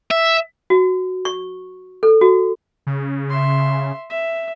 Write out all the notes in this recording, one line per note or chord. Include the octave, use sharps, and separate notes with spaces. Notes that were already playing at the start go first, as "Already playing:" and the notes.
E5
F#4
C#6
A4
F#4
C#3
E5 C6
E5